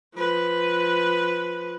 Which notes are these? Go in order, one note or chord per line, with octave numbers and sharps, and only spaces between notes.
F3 B4